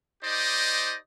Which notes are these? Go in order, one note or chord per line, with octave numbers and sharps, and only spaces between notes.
D#4 G4 C5 D5 D#5